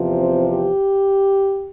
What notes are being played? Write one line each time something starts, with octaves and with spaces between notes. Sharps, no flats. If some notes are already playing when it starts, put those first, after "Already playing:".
Already playing: E2 C3 F3
C4
G4